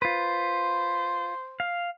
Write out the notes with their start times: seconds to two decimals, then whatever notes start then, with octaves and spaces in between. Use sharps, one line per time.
0.02 F4 B4 C5
1.60 F5